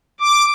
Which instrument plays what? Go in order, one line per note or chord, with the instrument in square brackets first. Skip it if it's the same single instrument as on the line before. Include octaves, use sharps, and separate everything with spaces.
[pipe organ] D6